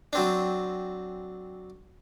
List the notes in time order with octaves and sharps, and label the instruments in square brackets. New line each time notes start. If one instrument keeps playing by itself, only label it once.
[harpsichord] F#3 C4 D4